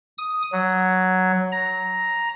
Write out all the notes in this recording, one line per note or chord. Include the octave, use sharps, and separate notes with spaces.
D#6
F#3
A#5